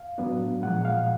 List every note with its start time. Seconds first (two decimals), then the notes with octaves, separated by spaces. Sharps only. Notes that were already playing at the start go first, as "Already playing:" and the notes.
Already playing: F5
0.18 A2 F#3 B3 D4
0.62 A#2 F3 G#3 F#5
0.85 F5